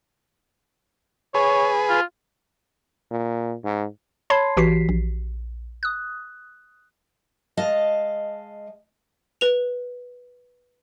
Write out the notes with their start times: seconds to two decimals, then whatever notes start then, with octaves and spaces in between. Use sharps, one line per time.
1.35 G#4 B4 C#5
1.89 F4
3.11 A#2
3.64 G#2
4.30 C#5 A5 B5 C6 G#6 C7
4.57 A1 E3 F#4 G4 B6 C7
4.89 A#1
5.83 D#6 F#6
7.57 G#3 D#5 F5 A5
9.41 B4 F7